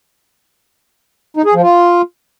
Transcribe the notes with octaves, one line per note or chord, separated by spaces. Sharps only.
D#4
G#4
F3
F4